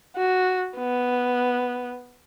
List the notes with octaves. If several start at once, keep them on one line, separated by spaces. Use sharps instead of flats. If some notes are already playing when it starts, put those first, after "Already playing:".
F#4
B3